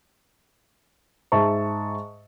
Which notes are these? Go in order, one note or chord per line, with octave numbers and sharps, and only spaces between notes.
G#2 E5 A5 C#6